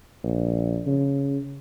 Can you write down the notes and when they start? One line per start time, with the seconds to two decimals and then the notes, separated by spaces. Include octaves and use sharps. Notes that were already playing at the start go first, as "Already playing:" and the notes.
0.24 A#1
0.87 C#3